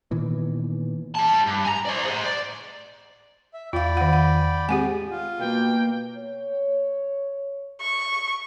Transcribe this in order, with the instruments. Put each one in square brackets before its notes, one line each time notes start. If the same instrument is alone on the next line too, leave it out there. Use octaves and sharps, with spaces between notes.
[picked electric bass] A#2 D#3 E3 B3
[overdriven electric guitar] G3 A5
G2
G#5 A#5
C5 D5
G#4 C5
D5
[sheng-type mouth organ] E5
[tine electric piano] E2 [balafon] F4 F5 [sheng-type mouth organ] D5 G5 B5
[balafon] D#3 F#5
F#5
[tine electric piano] G#3 C4 G#4 [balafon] G4 F#5 G#5
[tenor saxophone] F4
[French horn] B2 [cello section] A#3 [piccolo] G5
[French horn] C#5
[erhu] C#6